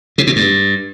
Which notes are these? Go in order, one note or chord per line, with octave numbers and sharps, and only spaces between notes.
C3
B2
G2